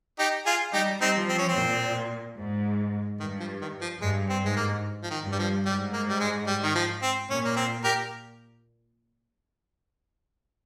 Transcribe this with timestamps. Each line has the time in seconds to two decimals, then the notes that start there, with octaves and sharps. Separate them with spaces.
0.19 D#4 G4
0.46 F4 G#4
0.73 G3 D#4 G4
1.01 C4 D#4
1.15 F3
1.29 C4
1.38 C#4
1.48 C4
1.56 A#2
2.37 G#2
3.19 G2 D#3
3.40 F3
3.61 D#3
3.81 F3
4.01 G2 G#3
4.29 C4
4.43 G#2 G#3
4.56 A#3
5.03 F3
5.10 D#3
5.24 G2
5.32 G3
5.39 F3
5.66 G#2 G3
5.93 A#3
6.09 G3
6.20 G#3
6.47 G3
6.63 D#3
6.75 F3
7.03 C4
7.30 A#2 C#4
7.45 A#3
7.56 C4
7.84 G4 A#4